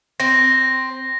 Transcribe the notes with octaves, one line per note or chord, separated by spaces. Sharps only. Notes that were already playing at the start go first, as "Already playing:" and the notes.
C4 A#6